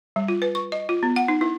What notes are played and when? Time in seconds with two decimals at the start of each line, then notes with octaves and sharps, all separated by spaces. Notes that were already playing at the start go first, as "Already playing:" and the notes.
0.16 G3
0.28 F4
0.42 B4
0.55 C#6
0.72 D#5
0.89 F4
1.03 B3
1.16 F#5
1.28 D#4
1.41 E4